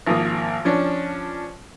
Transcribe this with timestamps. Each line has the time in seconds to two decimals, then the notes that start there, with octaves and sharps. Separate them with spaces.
0.07 G#1 F3 A#3 D#6
0.65 F3 C#4 D4